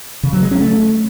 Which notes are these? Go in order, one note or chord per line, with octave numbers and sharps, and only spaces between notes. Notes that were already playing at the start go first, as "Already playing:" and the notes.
C#3
F#3
G#3
C#4
A3